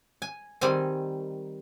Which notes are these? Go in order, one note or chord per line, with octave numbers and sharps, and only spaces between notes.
G#5
D#3 G3 C4 G#5